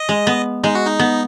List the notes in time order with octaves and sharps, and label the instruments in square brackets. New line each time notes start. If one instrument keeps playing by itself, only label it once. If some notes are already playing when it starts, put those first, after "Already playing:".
Already playing: [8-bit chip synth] D#5
[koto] G#3
B3
[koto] G#3 [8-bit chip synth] D#4
[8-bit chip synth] F#4
D#4
[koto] B3